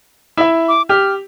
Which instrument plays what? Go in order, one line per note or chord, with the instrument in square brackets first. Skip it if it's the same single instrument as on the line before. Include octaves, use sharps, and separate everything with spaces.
[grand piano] E4 E5
[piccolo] D6
[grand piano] G4 [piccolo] F6